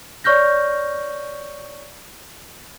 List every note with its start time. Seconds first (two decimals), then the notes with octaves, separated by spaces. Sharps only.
0.24 C#5 D5 C#6 F6 G6 A#6